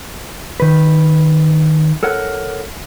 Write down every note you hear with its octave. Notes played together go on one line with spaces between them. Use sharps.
D#3 B4
A4 A#4 C#5 F#5